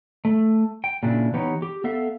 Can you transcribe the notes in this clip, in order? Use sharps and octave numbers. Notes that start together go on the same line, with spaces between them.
A3
G5
A#2 C#3 D4 E4
E3 B3 D#4 G4 C#5
G4
B3 A4 E5 F5